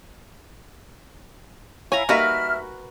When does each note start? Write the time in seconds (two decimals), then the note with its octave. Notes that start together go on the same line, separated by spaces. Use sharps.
1.92 E4 C#5 F5 G#5 A#5
2.09 G3 A#3 D#4 F#4 A#4 B4 E5 F6